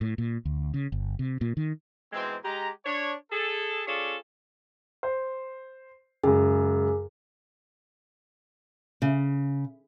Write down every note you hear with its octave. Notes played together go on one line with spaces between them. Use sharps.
A2
A#2
D2
C#3
G1
C3
A#2
D#3
G#2 B2 E3 G#3 C4
G#3 G4 A#5
D4 C#5
G#4 A4
C#4 F4 G#4 A4 C#5 D5
C5
F#2 C#3 G#3 G#4
C#3